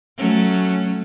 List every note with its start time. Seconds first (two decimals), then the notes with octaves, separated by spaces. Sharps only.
0.17 F#3 A3 C#4